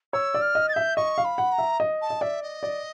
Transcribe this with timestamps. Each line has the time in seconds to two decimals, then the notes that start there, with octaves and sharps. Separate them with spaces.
0.13 C#5 E6
0.34 D5
0.41 F6
0.55 D#5
0.68 A6
0.73 E5 G6
0.96 D#5 C#6
1.18 F5
1.24 B5
1.38 F#5
1.52 A#5
1.58 E5
1.80 D#5
2.01 A5
2.10 D#5
2.21 D5 E5
2.42 D#5
2.63 D5